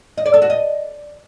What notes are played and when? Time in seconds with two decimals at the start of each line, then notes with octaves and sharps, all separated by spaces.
0.18 D#5
0.26 D5
0.34 A4
0.42 F#4
0.50 D#5